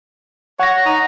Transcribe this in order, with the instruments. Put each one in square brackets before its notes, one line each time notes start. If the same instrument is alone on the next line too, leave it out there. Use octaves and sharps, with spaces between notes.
[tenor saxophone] C#5 [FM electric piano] F#5 A#6
[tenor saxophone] D#4